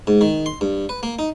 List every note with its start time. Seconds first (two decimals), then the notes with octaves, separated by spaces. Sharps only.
0.07 G#2
0.21 D#3
0.46 C6
0.61 G2
0.89 B4
1.03 A#3
1.19 D#4